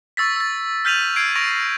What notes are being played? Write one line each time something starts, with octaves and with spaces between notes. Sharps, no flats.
C#6 E6 A6 B6
E6 A6
F6 G6 B6 D#7 F7 F#7
F6 G#6 C7 D7
C#6 A#6 D7 F7